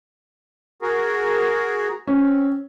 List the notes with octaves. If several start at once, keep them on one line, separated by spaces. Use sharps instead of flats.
F#4 G#4 A#4
C4 C#4